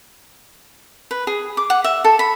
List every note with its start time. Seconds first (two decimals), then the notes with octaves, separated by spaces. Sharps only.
1.11 B4
1.27 G#4
1.57 D6
1.70 F#5
1.84 E5
2.04 A4
2.19 B5